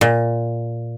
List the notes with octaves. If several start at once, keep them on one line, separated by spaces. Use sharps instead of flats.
A#2